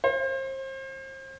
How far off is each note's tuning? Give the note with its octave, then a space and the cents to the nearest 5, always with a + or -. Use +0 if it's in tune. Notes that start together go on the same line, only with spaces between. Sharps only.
C5 +35